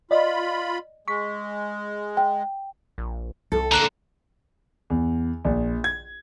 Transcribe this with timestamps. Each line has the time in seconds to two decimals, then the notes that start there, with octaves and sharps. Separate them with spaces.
0.11 F4 D5 D#5 B5
1.08 G#3 C#6 B6
2.17 G5
2.98 A#1
3.52 C2 A4
3.72 D3 A#3 A#5 F#6 E7
4.90 E2
5.45 A#1
5.84 G#6